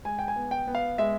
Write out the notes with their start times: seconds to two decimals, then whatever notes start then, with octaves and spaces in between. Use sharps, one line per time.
0.05 G#3 G#5
0.19 G5
0.28 G#5
0.36 B3
0.51 G5
0.67 B3
0.75 F5
0.98 G#3 E5